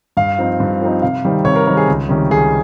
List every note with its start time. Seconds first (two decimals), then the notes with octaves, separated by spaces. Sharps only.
0.17 G2 F5
0.39 F3 C4 D#4
0.60 G2
0.81 F3 C4 D#4
1.02 C3 F5
1.24 D#3 G3 C4 D#4
1.45 C3 C#5
1.56 A#4
1.67 D#3 G3 C4 D#4 A#4
1.77 G#4
1.88 C#2
2.09 C3 D#3 G3 C#4
2.30 C#2 G#4